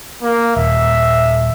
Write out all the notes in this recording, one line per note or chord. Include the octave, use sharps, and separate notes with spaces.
A#3
D#1 E5